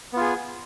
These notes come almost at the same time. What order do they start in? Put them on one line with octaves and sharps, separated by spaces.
B3 F4 G#4